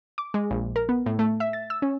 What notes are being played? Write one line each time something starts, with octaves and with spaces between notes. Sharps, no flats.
D6
G#3
A#1
A#4
B3
A2
A3
E5
A6
E6
C#4